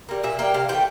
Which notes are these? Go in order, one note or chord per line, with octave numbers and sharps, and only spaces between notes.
G3 A#3
A#2 E5
G3 A#3 G5
C3 F5
E3 A3 G5